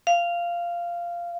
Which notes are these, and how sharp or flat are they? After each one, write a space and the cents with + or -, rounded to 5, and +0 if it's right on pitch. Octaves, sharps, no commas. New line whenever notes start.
F5 -10